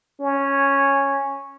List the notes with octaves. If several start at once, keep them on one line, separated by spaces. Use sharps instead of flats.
C#4